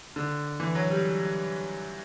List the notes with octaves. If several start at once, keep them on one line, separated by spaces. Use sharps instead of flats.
D3
E3
F#3
G3